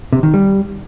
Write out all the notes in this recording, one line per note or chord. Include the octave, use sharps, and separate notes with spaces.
C3
D#3
G3